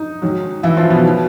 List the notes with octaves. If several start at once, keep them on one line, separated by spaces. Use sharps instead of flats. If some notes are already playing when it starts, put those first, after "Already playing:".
Already playing: D#4
G#2 D#3 F#3
E3 E4
F3 F4
B2 B3
D#3 F#3